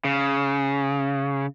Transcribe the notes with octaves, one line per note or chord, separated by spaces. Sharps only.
C#3